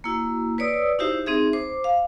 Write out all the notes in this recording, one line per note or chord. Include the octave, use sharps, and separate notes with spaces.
A#3 E4 F#4
B4 C#5 D5 D#6 E6
D#4 E4 F#4 G4 C5 E5
C4 D#4 G#4 E5
C5 D6
F5